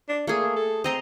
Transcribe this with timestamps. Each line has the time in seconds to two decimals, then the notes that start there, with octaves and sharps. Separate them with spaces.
0.08 D4
0.27 A3 A#3 G#4
0.56 A4
0.84 C4 D#5 A#5 C6